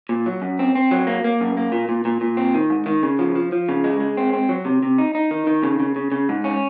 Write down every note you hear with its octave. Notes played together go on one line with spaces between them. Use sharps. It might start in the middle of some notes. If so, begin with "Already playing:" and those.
A#2
F#3
F#2
C4
C4
F#3
A#3
A#3
F#2
A#3
A#2
A#2
A#2
A#2
C4
D#3
G#2
D#3
C#3
F3
F3
F3
C#3
G#3
G#3
C4
C4
F#3
C3
C3
D#4
D#4
D#3
D#3
C#3
C#3
C#3
C#3
G#2
C#4